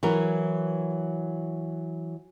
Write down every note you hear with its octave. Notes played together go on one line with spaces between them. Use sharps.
E3 F#3 A#4